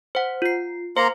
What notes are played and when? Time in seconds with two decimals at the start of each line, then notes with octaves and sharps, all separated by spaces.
0.15 C5 F#5
0.42 F4 C7
0.97 A#3 C5 A#5 C6